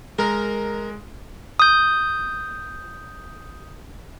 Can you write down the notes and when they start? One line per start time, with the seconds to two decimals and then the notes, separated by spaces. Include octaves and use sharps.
0.19 G#3 A#4
1.59 D#6 G6